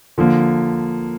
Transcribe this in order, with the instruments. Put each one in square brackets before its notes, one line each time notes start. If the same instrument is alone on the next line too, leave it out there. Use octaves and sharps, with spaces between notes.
[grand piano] D3 F3 A#3